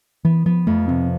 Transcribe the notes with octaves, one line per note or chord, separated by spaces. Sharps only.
E3 B3
F3 B3
F2 A3
C3 C4